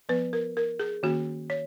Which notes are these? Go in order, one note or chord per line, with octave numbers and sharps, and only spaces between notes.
F3 B3 B4
A#4
A#4
G#4
D#3 A#3 C#4 F#4
C#5